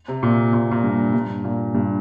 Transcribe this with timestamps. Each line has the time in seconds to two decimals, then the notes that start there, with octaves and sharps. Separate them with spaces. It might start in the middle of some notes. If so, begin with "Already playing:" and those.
0.08 C3
0.23 A#2
0.53 A#2
0.71 A#2
0.84 G2
1.14 G2
1.44 A#2
1.75 G2